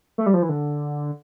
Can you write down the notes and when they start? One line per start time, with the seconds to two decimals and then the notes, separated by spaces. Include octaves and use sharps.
0.18 A3
0.26 G3
0.34 F3
0.42 E3
0.49 D3